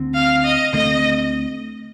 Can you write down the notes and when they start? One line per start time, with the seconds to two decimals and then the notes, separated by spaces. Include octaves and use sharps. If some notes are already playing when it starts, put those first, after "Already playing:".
Already playing: D2 D3 C4
0.14 F5
0.44 D#5
0.73 D2 D3 A3 C4 D#5